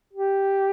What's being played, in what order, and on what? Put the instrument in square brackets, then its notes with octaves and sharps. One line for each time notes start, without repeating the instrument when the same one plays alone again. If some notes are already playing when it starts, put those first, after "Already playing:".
[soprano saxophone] G4